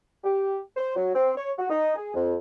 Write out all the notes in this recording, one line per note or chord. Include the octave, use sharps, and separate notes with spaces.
G4
C5
F#3
C4
C#5
F#4
D#4
G#4
F2